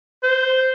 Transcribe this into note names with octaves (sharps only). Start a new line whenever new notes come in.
C5